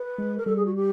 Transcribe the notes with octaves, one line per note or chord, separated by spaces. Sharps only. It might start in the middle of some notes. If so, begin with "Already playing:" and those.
Already playing: B4
G#3
A#4
G3 A4
G#4
F#4
G4